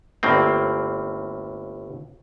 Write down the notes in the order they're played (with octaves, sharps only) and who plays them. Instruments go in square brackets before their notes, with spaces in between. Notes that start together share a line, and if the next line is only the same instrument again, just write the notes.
[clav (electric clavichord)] G1 A2 A#3 C4